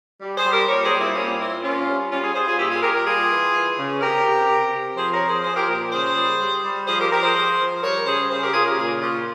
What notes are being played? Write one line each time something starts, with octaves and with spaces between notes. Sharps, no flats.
G3
G#4 C5
G3
G4 A#4
A#2 A#4 C#5
G#4 C5
G3
C4 E4
A#2 A#3 C#4
A#2 C4 E4
A#2 C#4 F4
G3
G3 C#4 F4
F4 G#4
G3 G#4 C5
F4 G#4
A#2 E4 G4
F4 G#4
A#2 G4 A#4
G4 A#4
G3 F4 G#4
E3
E3
C#3
C3 G4 A#4
C3
C3
C3
F3 G#4 C5
A#4 C#5
F3
G#4 C5
F3 G#4 C5
G4 A#4
A#2 G4 A#4
C#3 G#4 C5
G3
G3
G3
F3 G#4 C5
G4 A#4
F3 G4 A#4
G#4 C5
F3
F3
G3 A#4 C#5
C#3 G#4 C5
C#3 G#4 C5
G4 A#4
C#3 F4 G#4
G4 A#4
A#2 F4 G#4
A#2 C#4 F4